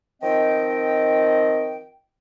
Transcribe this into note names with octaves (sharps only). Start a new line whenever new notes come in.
D#3 F3 C4 D#5 G5